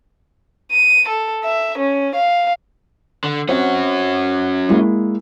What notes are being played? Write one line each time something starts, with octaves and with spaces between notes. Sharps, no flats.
D#7
A4
E5
C#4
F5
D3
C4 C#4 F#4 F#5
G#3 A#3 E4